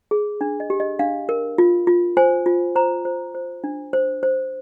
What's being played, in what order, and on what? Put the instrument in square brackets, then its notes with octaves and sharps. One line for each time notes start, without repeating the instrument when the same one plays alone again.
[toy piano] G#4
D4
D#5
G4
D#5
D4 F5
A#4
F4
F4
C5 G#5
F4
C5 A#5
C5
C5
D4
C5
C5